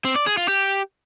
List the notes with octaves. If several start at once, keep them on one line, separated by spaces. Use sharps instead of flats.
C4
D5
G#4
F4
G4